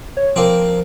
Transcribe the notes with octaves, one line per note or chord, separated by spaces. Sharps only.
C#5
F3 A#3 C4